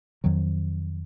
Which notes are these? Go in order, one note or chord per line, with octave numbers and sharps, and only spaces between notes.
F2 D#3 F#3